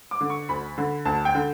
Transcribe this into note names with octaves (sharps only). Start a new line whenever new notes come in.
D6
D3
C#6
D2 B5
D3
D2 A5
G5
D3